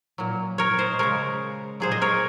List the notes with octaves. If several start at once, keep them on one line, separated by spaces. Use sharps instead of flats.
A#2 F#3
A#4 C#5
C5 D#5
C#3 G#3 A#4 C#5
A#2 F#3 G#4 C5
D#5
A#4 C#5